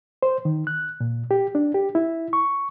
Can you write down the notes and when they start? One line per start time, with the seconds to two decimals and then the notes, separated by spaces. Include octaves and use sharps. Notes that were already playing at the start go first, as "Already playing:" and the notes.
0.23 C5
0.45 D#3
0.67 F#6
1.01 A#2
1.31 G4
1.55 D4
1.74 G4
1.95 E4
2.33 C#6